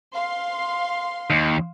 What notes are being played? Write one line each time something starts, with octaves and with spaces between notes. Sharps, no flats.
F5 C6
D#2